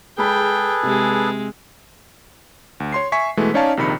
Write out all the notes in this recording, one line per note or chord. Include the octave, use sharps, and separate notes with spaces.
G#3 G#4 A4 B4 G5 B5
C3 G#3
D2
C#5 C6 C7
E5 G#5 C#6 B6
B2 E3 G#3 A3
C#4 D#4 C#5 D5 F5 A5
A#1 C3 D#3 B5 C#7